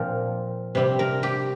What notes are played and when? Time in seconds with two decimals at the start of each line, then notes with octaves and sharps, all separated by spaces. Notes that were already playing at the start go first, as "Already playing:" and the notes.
Already playing: A#2 F3 C4 A#4
0.75 C3 G3 C4
0.99 A#4
1.23 G4